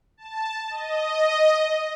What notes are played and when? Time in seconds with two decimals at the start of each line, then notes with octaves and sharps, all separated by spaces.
0.17 A5
0.70 D#5